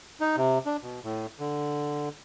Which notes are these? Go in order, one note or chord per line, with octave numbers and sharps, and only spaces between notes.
D#4
C3
D4
B2
A2
D3